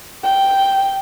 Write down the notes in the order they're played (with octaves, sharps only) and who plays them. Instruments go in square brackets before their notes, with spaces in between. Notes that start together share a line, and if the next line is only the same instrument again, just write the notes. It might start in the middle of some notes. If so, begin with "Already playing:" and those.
[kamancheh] G5